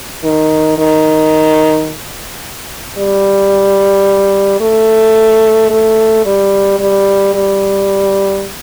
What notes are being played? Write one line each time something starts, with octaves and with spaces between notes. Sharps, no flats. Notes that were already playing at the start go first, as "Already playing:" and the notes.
D#3
D#3
G3
A3
A3
G3
G3
G3